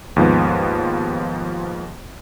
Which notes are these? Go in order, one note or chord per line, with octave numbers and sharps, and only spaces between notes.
D#2 G#2 F3 B3